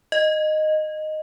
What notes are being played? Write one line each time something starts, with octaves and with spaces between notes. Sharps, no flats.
D#5